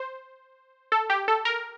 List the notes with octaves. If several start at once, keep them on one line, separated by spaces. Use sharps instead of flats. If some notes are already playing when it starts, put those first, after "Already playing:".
Already playing: C5
A4
G4
A4
A#4